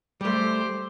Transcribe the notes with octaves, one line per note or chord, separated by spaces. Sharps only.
G3 A3 G4 C5